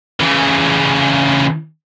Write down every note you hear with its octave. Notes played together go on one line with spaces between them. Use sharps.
C#3 E3